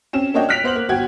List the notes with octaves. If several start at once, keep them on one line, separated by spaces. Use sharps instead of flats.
C4 C#4 E7
A#3 D4 F#4 C#5 D#5 G5
F6 F#6 B6 D7 F7
B3 C5 F#5 F#7
A#3
G1 F#4 G5 G#6